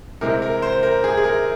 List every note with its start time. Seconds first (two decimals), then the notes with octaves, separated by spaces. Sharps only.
0.21 C3 E3 G#3 C4 A#4
0.42 A#4
0.62 C5
0.83 A#4
1.04 G#4
1.18 G#4
1.24 A#4